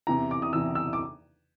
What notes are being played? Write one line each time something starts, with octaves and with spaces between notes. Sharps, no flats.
E2 C3 E3 A#5
D6
D#6
E2 C3 E3 E6
E6
D6